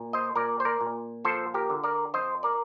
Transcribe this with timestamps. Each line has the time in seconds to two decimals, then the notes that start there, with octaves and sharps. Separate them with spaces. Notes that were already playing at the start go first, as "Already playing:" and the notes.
Already playing: A#2
0.13 C5 D#5
0.36 A#2 A#4 D5
0.60 C5
0.65 A#4 D5
0.81 A#2
1.25 F3 A4 C5
1.54 G4 A#4
1.70 D3
1.84 A#4 D5
2.14 F2 C5 D#5
2.43 A#4 D5